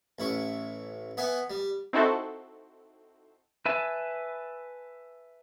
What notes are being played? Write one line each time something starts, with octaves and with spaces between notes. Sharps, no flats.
A1 E4 C#6
B3 E5 F#5 G#5
G3
C4 D#4 E4 F#4 A4 C5
B4 E5 G#5 A5